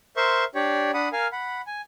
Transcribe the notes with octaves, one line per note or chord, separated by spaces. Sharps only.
A#4 C5 E5 C6 C#6
D4 G4 C#5 D5
D4 F#5 B5 D#6
A#4 F5 G#5
F#5 B5
G#5